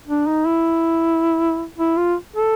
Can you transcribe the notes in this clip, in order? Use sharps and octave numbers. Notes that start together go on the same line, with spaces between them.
D4
D#4
E4
E4
F4
A4